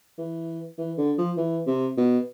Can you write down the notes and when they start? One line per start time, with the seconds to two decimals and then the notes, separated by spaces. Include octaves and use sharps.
0.18 E3
0.78 E3
0.98 D3
1.18 F3
1.37 E3
1.67 C3
1.97 B2